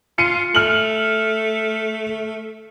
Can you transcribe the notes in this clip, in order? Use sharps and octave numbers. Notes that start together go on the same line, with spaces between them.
F4 C#7 D#7
A3 F6 F#7